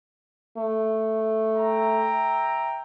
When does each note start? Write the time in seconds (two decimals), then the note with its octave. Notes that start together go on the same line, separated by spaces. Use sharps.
0.57 A3
1.56 E5 G5 A#5